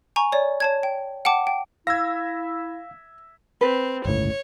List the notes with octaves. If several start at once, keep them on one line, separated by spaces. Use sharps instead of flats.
G#5 A#5 C#6
C#5 D5
C#5 A5 G#6
G5
F#5 G5 A5 D6
G5
E4 E5 F5 E6 G#6 A#6
C4 B4
G1 C#2 A2 C#5